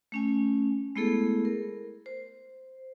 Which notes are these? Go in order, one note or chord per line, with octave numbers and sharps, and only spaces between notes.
A3 C#4 G#5
G#3 A3 B3 E4 G#4 A4
A#4
C5